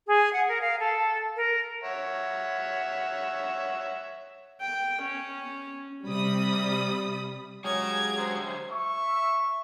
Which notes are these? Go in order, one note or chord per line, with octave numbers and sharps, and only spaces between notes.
G#4
F#5
A#4
F5
A4
A#4
C#5 E5 F#5
G5
C#4
C3 G3 B5 D#6
F#3 G#3 G4 G#4 C#5 A#5 D#6 G#6
D3 C5
E5 C#6